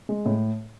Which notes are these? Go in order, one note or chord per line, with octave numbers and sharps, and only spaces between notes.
G#3
A2